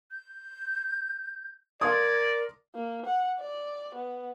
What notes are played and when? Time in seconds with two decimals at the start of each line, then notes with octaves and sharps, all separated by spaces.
0.11 G6
1.81 A#4 D5 F5 C6 D#6 G#6
2.75 A#3
3.06 F#5
3.40 D5
3.95 B3